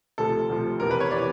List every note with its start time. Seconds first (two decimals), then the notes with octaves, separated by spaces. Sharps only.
0.18 D2 C3 F3 A4
0.49 D2 C3 F3
0.79 E2 C3 E3 A#4
0.91 B4
1.00 C#5
1.11 C3 E3 D5